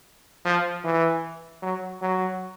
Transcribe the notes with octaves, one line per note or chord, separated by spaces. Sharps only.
F3
E3
F#3
F#3